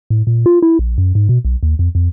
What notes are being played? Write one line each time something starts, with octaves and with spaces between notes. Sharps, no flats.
A2
A#2
F4
E4
A#1
F#2
G#2
B2
B1
D#2
F2
F2